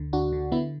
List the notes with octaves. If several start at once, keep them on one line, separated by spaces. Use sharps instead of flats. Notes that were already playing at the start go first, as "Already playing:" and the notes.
Already playing: D2 D3
D2 D4 F#4
D3
D3 B3 E4